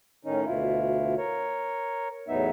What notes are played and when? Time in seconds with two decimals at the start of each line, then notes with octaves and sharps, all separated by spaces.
0.25 A2 D#3 C#4 D#4
0.45 D2 B2 E4 F4
1.18 A#4 C#5
2.28 E2 A2 F#3 B3 D#4 E5